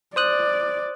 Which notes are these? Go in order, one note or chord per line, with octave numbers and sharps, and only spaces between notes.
C5 D5 D#6 F#6